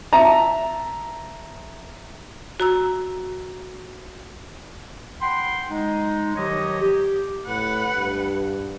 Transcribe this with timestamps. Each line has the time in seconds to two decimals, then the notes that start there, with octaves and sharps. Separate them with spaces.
0.13 E5 A5 A#5
2.60 F#4 A#5 E6
5.22 F#5 G5 B5 C6
5.70 G#3 D#4
6.36 D#3 F3 F#3 G4 C#5 D#5
6.80 G4
7.46 A2 B4 F#5
7.92 G2